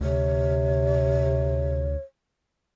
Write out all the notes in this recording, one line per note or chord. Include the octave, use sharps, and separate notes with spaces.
D2 C3 C#5